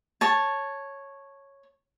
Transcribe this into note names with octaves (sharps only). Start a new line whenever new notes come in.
C#5 A5